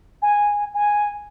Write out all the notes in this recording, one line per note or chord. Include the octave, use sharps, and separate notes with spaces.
G#5
G#5